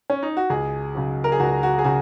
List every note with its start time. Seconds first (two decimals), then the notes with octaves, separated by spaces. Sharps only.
0.10 C#4
0.22 D#4
0.37 F#4
0.50 C#2 G#4
0.95 C#3 F#3
1.24 A#4
1.32 G#4
1.40 C#2 F#4
1.63 F#4
1.79 G#4
1.84 C#3 F#4